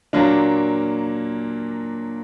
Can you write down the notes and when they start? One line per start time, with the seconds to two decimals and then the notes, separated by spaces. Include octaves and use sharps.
0.13 A#2 F#3 A#3 D4